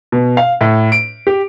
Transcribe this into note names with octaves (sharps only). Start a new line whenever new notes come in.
B2
F5
A2
D7
G4